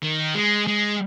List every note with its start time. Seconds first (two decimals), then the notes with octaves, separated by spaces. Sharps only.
0.03 D#3
0.35 G#3
0.67 G#3